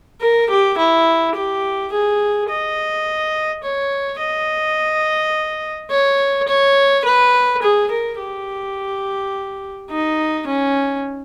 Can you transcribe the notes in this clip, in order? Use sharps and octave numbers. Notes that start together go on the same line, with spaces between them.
A#4
G4
E4
G4
G#4
D#5
C#5
D#5
C#5
C#5
B4
G#4
A#4
G4
D#4
C#4